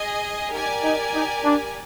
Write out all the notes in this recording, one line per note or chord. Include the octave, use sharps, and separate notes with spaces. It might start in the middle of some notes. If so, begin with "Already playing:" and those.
Already playing: G#4 D#5 G#5
D#4 G4 A#4 D5 G#5
D#4
D#4
D4